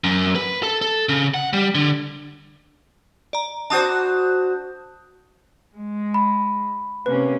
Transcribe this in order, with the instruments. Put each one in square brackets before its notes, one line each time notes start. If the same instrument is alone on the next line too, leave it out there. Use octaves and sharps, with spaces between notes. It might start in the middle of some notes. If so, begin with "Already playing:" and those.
[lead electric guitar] F#2
B4
A4
A4
C#3
F#5
G3
D3
[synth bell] D5 A#5
[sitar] D4 F#4 C5 [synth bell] A5 D#6 G6
[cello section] G#3
[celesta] B5
[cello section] C3 A#3 C#4 [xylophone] B4